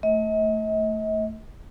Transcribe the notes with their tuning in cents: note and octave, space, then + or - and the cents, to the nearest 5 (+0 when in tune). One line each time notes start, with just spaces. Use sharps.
A3 +10 D#5 +40